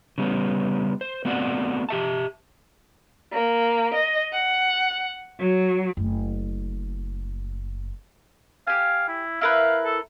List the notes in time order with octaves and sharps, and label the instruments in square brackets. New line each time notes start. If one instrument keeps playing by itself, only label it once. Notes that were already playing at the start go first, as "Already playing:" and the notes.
[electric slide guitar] C#3 G3 B3 C#4
C5
A3 B3 C4 F#4 D5 F#5
G4 E5 A5
[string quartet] A#3
D#5
F#5
F#3
[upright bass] F#1 A3
[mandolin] G4 G#5 [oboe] F5
[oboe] E4
[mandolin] E4 A#4 B4 [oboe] F5
[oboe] A4